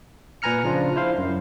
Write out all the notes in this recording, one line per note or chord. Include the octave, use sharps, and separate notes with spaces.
A#2 B4 G#5 A#5 F6 C#7
C#3 F3 D4 F4
E4 C5 F5
F#2